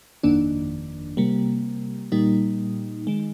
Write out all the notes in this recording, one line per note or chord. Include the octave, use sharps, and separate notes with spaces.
G1 F2 D#3 A#3 D4
C3 G3 A#3
A#2 G3 A#3 D#4
D#3 G#3